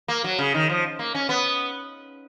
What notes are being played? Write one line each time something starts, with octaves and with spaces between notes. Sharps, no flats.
A#3
F#3
C#3
D#3
F3
A#3
C#4
B3